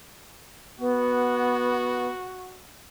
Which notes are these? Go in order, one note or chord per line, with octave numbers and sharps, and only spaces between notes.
B3 F#4